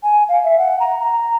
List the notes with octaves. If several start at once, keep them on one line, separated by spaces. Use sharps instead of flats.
G#5
F5
E5
F#5
A#5
A#5